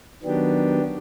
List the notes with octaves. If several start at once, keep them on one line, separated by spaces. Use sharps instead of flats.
D#3 F#3 B3 D4 G4